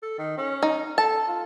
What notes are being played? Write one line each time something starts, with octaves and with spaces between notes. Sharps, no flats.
A4
D#3
C#4
D#4
A4 A5
F4